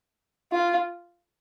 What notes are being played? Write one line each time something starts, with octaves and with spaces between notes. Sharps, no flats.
F4